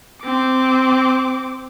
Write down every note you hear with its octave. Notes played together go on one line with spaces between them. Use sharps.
C4 D6